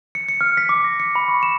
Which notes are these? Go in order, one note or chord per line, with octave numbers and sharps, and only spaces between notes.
C#7
C#7
F6
B6
D6
A#6
C#7
B5
C#6
E7